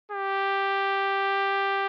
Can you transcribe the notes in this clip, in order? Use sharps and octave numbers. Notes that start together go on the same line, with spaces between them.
G4